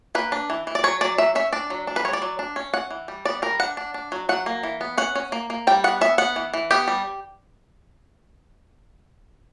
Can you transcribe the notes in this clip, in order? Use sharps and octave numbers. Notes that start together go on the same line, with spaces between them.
A#3 B4
D4
E3
E3
D5
F#3 C#5
F#3 D5
F#3 E5
C#4 E5
D4 D5
F#3
D4
B4
G3 C#5
D5
F#3
D4
C#4
C#4 F#5
E3
G3
B3 D5
G3 A#4
D4 F#5
D4
D4
F#3
F#3 F#5
A#3
E3
B3
C#4 F#5
C#4
A#3
A#3
G3 G5
B3 F#5
B3 E5
B3 F#5
E3
E3
B3 G4
G3